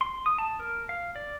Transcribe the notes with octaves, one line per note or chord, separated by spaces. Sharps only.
C6
D#6
A5
A#4
F5
D5